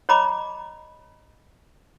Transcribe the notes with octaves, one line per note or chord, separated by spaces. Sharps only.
C#5 D#5 A#5 B5 D6